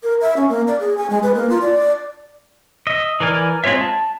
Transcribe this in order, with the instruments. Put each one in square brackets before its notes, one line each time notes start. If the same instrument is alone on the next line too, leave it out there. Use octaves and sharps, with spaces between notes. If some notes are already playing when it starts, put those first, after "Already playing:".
[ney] A#4
E5
C#4
A#3
D5
G#4
G#5
G#3
B4
A#3
F4
D5
[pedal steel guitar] D#5 E5
E3 A#4 D5 G#5 F6
G#3 C4 F4 C#5 E5
A5